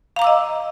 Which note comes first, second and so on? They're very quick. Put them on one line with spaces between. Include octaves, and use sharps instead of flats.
F5 A#5 D6 E6 D#5